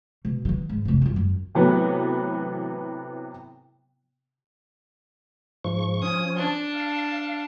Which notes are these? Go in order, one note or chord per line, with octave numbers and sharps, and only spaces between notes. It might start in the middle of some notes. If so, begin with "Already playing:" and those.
B2
D3 E3
G#2
F1 C2
G2 F4
F#2
A2 C3 E3 F#3 B3
G#2 F3 C#6
F3 C#4 D#6
D4 A5
F5